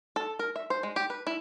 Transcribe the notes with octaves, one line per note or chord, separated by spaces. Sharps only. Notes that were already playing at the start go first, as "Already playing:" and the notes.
A4
A#4
E5
C5
G#3
G4
B4
E4